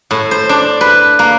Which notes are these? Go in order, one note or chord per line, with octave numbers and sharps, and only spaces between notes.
A2
C5
D4
B4
A#3